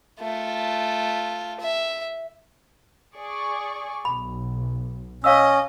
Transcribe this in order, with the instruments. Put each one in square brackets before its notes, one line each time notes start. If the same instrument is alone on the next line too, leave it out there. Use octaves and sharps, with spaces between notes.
[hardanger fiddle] A3 F4
E5
[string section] G#4 D5 C#6
[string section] B1 [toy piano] B5
[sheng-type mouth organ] C#4 [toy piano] C#5 F5 E6 [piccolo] D#5